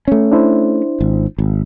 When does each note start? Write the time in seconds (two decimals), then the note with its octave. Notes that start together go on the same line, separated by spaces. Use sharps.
0.08 A3 C#4
0.32 D4 E4 C5
1.01 G#1
1.38 G#1